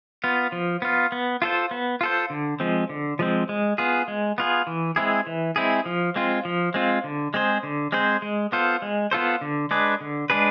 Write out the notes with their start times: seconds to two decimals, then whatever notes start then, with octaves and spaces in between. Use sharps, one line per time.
0.24 B3 F4
0.52 F3
0.82 B3 F4
1.12 B3
1.42 F4 A4 C5
1.71 B3
2.01 F4 A4 C5
2.30 D3
2.60 F3 G#3 C4
2.89 D3
3.19 F3 G#3 C4
3.49 G#3
3.78 B3 F4 G#4
4.08 G#3
4.38 B3 F4 G#4
4.67 E3
4.96 G#3 C4 E4 G#4
5.27 E3
5.56 G#3 C4 E4 G#4
5.86 F3
6.16 G#3 C4 F4
6.45 F3
6.74 G#3 C4 F4
7.04 D3
7.34 G#3 C4 G#4 C5
7.63 D3
7.92 G#3 C4 G#4 C5
8.22 G#3
8.52 B3 F4 A4 C5
8.82 G#3
9.11 B3 F4 A4 C5
9.41 D3
9.71 G#3 D4 G#4 B4
10.01 D3
10.30 G#3 D4 G#4 B4